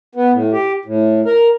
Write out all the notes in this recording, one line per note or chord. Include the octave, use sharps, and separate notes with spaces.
B3
A2
G4
A2
A#4